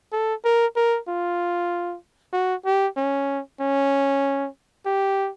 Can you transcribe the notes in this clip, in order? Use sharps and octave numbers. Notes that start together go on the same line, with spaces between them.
A4
A#4
A#4
F4
F#4
G4
C#4
C#4
G4